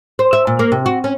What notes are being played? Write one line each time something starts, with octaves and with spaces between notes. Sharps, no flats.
C5
E5
A#2
A#3
C3
F#4
C#4